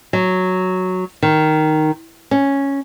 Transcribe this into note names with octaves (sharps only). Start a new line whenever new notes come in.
F#3
D#3
C#4